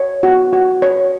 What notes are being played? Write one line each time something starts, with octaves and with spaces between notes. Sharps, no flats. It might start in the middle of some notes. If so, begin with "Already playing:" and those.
Already playing: C#5
F#4
F#4
C#5